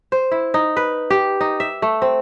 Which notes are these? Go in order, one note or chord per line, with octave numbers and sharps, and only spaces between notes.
C5
E4
D#4
B4
G4
D#4
E5
A3
C4